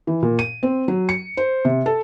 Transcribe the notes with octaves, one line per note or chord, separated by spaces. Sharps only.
E3
A#2
D#7
C4
F#3
C#7
C5
C3
A4